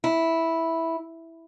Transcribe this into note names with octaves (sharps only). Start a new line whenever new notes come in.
E4